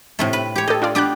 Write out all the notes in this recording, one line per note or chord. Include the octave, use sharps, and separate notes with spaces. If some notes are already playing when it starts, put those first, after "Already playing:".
A2 C3 A3
B4
G4 C#5
G4 A4 D#5
D4 F4 D5
B3 D4 G4 D6 F#6